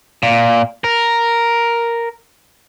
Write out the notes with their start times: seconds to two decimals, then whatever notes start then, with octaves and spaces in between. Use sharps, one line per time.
0.23 A#2
0.84 A#4